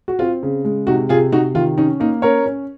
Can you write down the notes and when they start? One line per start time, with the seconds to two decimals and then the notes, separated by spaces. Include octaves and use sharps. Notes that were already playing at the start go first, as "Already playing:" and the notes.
0.08 F#4
0.19 C4 F4
0.43 C#3
0.65 G#3
0.87 C3 D#4 F#4
1.09 C3 F4 G#4
1.32 C3 D#4 F#4
1.55 D#3 F4
1.78 C#4 D#4
2.00 A#3 D#4
2.22 C#4 A#4 C#5
2.46 C#4